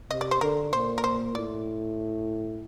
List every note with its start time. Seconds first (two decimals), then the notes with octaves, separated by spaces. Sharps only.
0.11 C3 D#5
0.21 D5
0.31 C5
0.41 D3 A#4
0.73 A#2 C5
0.98 A#4
1.04 C5
1.35 A2 D5